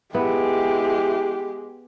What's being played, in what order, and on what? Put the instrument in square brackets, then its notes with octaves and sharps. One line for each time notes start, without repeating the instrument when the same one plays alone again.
[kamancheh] G#3 [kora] B3 [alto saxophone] E4 [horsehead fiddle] G4